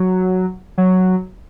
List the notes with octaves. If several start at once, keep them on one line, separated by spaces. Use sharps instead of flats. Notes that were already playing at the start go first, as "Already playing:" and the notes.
Already playing: F#3
F#3